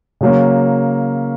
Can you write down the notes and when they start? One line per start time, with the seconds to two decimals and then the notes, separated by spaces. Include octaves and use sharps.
0.21 C#3 F#3 A#3 C#4